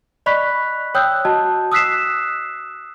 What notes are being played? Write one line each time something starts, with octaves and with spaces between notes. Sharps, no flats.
D5 D#5 B5 C#6 F#6 B6
C#5 G5 D#6 E6 F#6 G6
F#4 D#5 A5
D#6 E6 F#6 B6 C7 E7